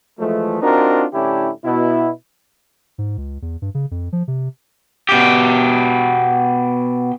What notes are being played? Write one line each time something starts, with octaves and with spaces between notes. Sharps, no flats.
E3 F3 G#3 A3
C4 D4 D#4 F4 F#4 A#4
A2 D3 C#4 D4 E4 G4
B2 E4
G#2
C#2
E2
G2
C#3
F2
F3
C3
B2 G4